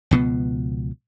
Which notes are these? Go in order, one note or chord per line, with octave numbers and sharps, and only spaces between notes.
C#2 B2 F3 B3